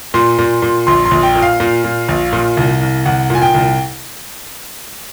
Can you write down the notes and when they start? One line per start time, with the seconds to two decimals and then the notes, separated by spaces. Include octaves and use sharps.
0.14 A#2 C6
0.39 A#2
0.62 A#2
0.87 A#1 C6
1.05 C6
1.11 A#1
1.23 G5
1.36 A#2
1.42 F5
1.60 A#2
1.84 A#2
2.09 A#1
2.33 A#2
2.57 C2
2.81 C2
3.06 C2 F#5
3.30 A#2 G#5
3.42 G5
3.54 C2